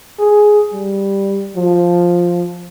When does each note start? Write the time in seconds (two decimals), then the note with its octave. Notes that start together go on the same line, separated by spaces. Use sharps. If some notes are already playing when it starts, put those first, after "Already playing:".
0.19 G#4
0.73 G3
1.57 F3